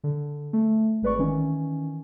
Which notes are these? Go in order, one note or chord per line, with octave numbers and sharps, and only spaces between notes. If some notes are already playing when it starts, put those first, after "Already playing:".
D3
A3
G#1 G#3 B4 D5 C#6
D#3 E3 C#4